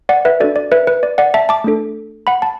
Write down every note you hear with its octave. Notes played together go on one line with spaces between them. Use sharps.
D5 F#5
B4 E5
D4 F#4 A4 D5
D5
B4 E5
B4
D5
D5 F#5
E5 A5
A5 D6
A3 D4 A4
F#5 B5
A5